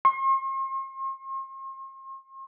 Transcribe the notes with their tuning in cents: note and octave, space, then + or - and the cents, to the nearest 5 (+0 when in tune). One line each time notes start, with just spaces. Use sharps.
C6 +45